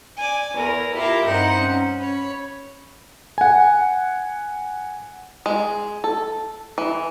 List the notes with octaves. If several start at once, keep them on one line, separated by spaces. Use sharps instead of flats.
D5 G#5
E2 A#4
E4 F4 G4 A#4 E5 F5
G2 C3 D#4 C5 F#5
C#4
C#5 B5
F#5 G#5
G#3
A4
E3